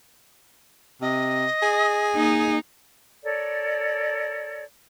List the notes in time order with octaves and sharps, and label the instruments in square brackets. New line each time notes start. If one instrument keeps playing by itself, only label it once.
[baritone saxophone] C3 [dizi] D#5
[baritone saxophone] G#4
[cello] A#3 D#4
[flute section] A4 A#4 C#5 D5